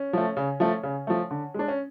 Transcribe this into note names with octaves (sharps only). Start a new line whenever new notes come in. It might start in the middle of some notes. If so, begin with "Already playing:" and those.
Already playing: C#4
F3 A3
C#3
F3 A3
C#3
F3 A3
D3
G#3 D4
C#4